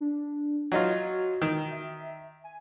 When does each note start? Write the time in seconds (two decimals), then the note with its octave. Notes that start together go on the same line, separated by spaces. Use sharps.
0.01 D4
0.72 F#3 D#4 F4 F#4
1.42 D#3 G5
1.71 E5
2.44 G#5